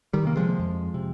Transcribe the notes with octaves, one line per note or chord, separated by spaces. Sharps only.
D#3 G3
C3 A#3
F3 G#3
F2
C3